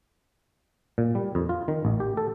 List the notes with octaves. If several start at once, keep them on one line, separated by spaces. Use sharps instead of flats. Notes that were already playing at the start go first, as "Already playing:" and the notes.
A#2
G3
F2
F4
D#3
A1
G4
A4